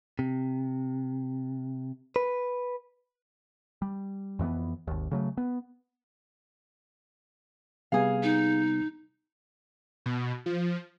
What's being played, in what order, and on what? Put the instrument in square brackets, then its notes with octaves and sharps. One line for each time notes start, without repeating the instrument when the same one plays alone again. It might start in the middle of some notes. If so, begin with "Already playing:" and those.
[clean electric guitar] C3
B4
[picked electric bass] G3
F2 E3 A#3 B3
G#1 D#2
C#3 F#3 A3
B3
[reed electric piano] C3 G3 B3 [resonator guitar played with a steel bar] G#4 F5
[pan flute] D#4
[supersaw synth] B2
F3